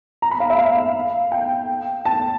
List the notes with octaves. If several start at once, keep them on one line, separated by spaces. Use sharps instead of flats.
A#5
B5
F5
E5
F5
G5
A5